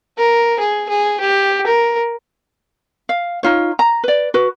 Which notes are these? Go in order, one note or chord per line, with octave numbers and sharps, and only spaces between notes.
A#4
G#4
G#4
G4
A#4
F5
D#4 F4 C#5
A#5
B4 D5
F#4 B4